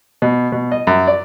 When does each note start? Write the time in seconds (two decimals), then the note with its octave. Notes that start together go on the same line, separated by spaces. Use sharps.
0.22 B2
0.52 B2
0.72 D#5
0.87 F#2
1.07 D5